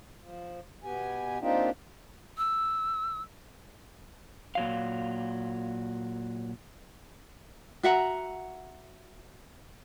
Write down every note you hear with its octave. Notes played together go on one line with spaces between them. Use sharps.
F3
B2 B3 G4 G#5
A#3 C4 D4 D#4 F4 G4
E6
A#2 F#3 F5
F#4 E5 F#5 A#5